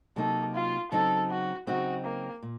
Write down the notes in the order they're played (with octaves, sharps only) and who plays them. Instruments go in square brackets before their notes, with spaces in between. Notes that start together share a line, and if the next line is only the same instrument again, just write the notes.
[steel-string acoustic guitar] C3 F#3 A#3 D#4 [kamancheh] A4
[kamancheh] F4
[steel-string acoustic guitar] C#3 F#3 C4 D#4 [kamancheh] A4
[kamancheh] F#4
[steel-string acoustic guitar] C#3 F#3 C4 D#4 [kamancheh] F#4
[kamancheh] A#3
[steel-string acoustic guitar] A#2